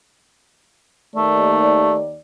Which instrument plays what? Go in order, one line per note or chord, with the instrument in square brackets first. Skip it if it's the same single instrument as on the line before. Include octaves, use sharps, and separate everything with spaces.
[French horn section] D#2 D#3 D5 [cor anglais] A3